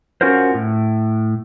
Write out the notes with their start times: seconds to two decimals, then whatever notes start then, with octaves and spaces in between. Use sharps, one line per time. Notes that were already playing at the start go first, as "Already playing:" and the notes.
0.21 C#4 F4 F#4 A#4 C5
0.54 A2